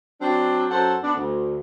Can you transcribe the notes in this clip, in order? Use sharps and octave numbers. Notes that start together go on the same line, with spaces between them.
F#3 C4 D4
F#2 A4 C5 F#5
B3 D4
D2